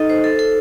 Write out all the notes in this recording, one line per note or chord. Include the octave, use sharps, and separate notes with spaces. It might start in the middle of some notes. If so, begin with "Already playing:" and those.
Already playing: D#4 A4 D#5
C5
A4
A4